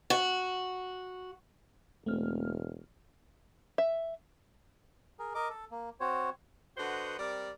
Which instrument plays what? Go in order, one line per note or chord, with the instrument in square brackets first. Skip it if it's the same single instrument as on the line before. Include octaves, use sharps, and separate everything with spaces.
[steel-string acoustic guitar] F#4
[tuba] E1 [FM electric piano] A3 C4 F6
[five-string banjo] E5
[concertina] G#4 A#4
A#4 D#5 D6
A4
A#3
C4 F#4 C5 C#5
[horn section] D3 F#4 B4 C5 D#5 F#5
G3 C4 A#4 D5